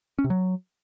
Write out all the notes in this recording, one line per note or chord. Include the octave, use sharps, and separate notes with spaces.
C#4
C3
F#3